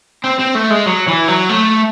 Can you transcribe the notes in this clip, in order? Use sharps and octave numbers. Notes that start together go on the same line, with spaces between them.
C4
C4
A3
G#3
F#3
E3
F#3
A3